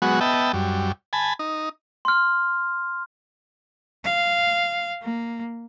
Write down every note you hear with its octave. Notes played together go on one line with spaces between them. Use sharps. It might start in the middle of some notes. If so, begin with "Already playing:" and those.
F#3 G#3 B3 F#4
B3 D#5 E5 G5 A5
F#2 G3
G#5 A5 B5
D#4
C6 F6
F5
A#3